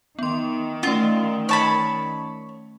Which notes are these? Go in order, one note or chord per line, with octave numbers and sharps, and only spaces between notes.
D#3 B3 C6
A3 C#4 F4
C#5 A5 B5